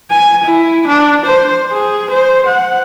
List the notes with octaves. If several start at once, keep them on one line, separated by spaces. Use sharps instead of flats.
G#5
E4
D4
C5
G#4
C5
F#5